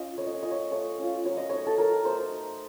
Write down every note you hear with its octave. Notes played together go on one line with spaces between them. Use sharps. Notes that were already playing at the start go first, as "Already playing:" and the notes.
Already playing: C#4 F4 D#5
A3 C#5
D#5
C#5
C#4 F4 D#5
C#5
A3 C#5
C#4 F4
F#3 C#5
D#5
A3 D#4 C#5
A4
F#3 A#4
A3 D#4 C5